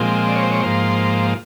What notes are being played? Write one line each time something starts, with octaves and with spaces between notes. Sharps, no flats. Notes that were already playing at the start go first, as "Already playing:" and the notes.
Already playing: A#2 F3 G#3 C4
D5
C#5
C5
C#5
G#2 F3 A#3 C5